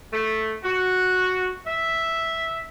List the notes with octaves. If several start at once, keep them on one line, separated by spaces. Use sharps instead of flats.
A3
F#4
E5